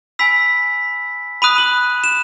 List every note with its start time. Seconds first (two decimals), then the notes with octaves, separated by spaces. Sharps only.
0.19 G#5 B5 E6 B6
1.42 B5 D#6 F#6 D#7
1.58 F#7
2.04 E7